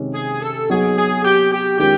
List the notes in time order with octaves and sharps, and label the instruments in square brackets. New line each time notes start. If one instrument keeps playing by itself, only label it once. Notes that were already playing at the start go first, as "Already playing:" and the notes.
Already playing: [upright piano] C3 D#3 G#3 C#4
[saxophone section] G#4
A4
[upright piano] F#3 B3 D#4 [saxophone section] G#4
[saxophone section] G#4
G4
G4
[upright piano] D#3 G#3 C#4 F4 [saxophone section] G4